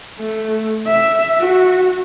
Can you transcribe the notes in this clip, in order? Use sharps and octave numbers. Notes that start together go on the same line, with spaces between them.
A3
E5
F#4